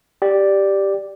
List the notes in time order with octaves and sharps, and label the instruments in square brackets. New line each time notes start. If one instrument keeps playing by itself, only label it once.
[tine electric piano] G4 D5